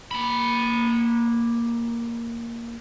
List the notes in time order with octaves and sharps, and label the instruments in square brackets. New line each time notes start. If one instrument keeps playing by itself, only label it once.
[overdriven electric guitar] A#3 B5